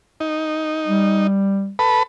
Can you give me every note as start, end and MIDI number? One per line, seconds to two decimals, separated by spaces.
0.20 1.27 63
0.87 1.72 55
1.79 2.03 69
1.79 2.03 71
1.79 2.03 83